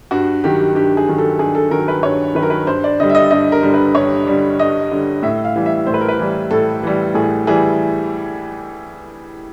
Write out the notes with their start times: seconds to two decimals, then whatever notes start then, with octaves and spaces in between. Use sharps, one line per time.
0.11 G2 F#4
0.44 D#3 F#3 G4
0.75 G2 G4
0.97 G#4
1.07 D#3 F#3
1.18 A4
1.39 G2 G#4
1.55 A4
1.71 D#3 F#3 A#4
1.88 B4
2.03 G2 C#5
2.35 D#3 B4
2.39 F#3 A#4
2.50 B4
2.67 G2 C5
2.84 D5
3.00 D3 G3 D#5
3.10 E5
3.15 D#5
3.31 G2 D#5
3.52 A#4
3.63 D3 G3
3.74 B4
3.95 G2 C#5
4.27 D3 G3
4.60 G2 D#5
4.91 D3 G3
5.23 A2 E5
5.45 F5
5.56 E3 G3
5.66 E5
5.87 A2 C5
5.94 B4
6.01 A#4
6.08 B4
6.19 E3 G3
6.51 A2 A4
6.83 E3 G3
7.14 A2 G#4
7.47 E3 G3 G#4